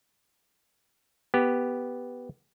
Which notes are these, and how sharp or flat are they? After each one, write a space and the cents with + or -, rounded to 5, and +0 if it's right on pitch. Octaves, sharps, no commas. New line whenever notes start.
B3 +0 G4 +0